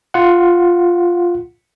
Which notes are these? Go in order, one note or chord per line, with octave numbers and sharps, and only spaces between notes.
F4 F#5